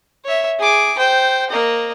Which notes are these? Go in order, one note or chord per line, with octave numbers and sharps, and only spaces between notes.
C#5 E5
G#4 D6
C5 G5
A#3 D#5